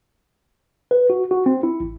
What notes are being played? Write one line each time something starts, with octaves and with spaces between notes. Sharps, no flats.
B4
F#4
F#4
C4
E4
A1